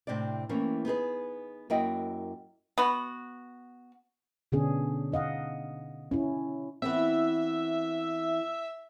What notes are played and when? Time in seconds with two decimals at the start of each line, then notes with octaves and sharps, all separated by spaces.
0.07 A2 C3 C4 D4 D5
0.49 E3 A3 A#3 C4 C#4
0.85 B3 D#4 G#4 B4
1.70 F#2 A#3 E4 F#4 D#5 G5
2.78 B3 F#4
4.52 B2 D3 B3 C#4 D4 G#4
5.12 D#4 D#5 F5 F#5
6.11 C#4 E4
6.82 E3 B3 C4 E5